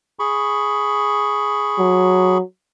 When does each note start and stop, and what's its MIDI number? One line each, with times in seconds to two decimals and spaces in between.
0.19 2.38 68
0.19 2.38 83
0.19 2.38 85
1.79 2.42 54